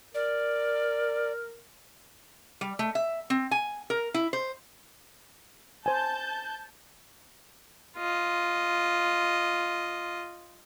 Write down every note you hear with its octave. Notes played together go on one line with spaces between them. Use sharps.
A#4 D5
G3
A3
E5
C4
G#5
A#4
E4
C5
C5 G#5 A5 G6
F4 D#5